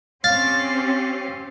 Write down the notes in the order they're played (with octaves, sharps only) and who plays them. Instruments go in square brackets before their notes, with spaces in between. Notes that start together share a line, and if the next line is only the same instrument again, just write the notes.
[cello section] C4 C#4 G4 [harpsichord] F5 [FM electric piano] A6